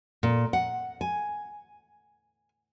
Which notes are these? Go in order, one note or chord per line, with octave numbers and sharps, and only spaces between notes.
A#2
F#5
G#5